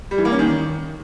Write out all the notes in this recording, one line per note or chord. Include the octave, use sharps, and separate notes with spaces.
G3
E3
A#3
C#4
D#3